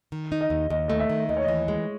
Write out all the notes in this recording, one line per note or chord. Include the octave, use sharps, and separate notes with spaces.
D#3
D#4
D#5
D#2
D#2 D#5
A3 D#5
E5
D#3
D#2 D#5
C#5
E3 D#5
G#3